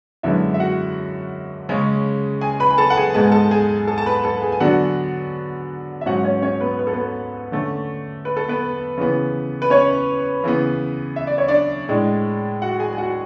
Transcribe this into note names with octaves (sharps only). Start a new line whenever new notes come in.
F#2 D3 G#3 B3 E4 E5
E5
F#4 F#5
C#3 G#3 C#4
G#4 G#5
B4 B5
B5
A4 A5
F#5
G#4 G#5
G#2 G#3 B3 A5
G#5
A4 A5
G#4 G#5
A4 A5
A5
B4 B5
A4 A5
G#4 G#5
G#5
D3 F#3 B3 D4 F#4 F#5
E5
G#2 F#3 C#4 F#4 F#5
C#4 C#5
C#4 C#5
B3 B4
B4
A4
B3 B4
D3 A3 C#4
B4
A4
B3 B4
C#3 E3 B3
B4
C#4 C#5
C#3 E3 B3
E5
D5
C#5
D4 D5
A2 G#3 D4
F#4 F#5
G#4 G#5
G#5
F#4 F#5